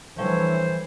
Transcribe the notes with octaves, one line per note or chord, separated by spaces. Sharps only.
E3 F3 G3 A3 D4 C5 C#5